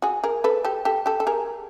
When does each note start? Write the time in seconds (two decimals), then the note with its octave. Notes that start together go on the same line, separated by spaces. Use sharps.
0.02 F#4 G#4
0.24 G#4 A#4
0.44 A4 B4
0.65 G4 A4
0.85 G4 A4
1.06 G4 A4
1.20 A4
1.27 G#4 A#4